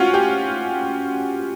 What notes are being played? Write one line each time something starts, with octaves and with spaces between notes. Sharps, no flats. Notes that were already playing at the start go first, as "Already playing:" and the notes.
Already playing: C#4 F4 F#4
G4